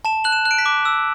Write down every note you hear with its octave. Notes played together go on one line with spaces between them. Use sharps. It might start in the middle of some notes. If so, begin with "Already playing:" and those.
A5 E7
F#6 F#7
E7
F#6
D7
B6
D6
E6